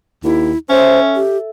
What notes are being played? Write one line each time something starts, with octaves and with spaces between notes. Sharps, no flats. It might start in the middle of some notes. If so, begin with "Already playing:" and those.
D#2 E4
C#4 A4 C5 E5
G4